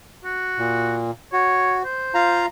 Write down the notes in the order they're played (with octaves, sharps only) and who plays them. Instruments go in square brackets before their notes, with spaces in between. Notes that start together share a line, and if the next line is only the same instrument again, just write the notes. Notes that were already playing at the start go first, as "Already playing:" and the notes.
[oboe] F#4
[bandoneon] A#2
[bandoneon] F#4 [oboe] C#5
[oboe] C5
[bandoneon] F4 F5 A#5